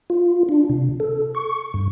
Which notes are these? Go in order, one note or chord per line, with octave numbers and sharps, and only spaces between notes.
F4
D4
C3
A4
C#6
G2